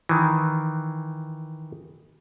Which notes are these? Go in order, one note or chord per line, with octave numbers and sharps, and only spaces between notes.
D#3 E3